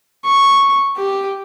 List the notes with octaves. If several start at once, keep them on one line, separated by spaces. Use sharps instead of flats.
C#6
G4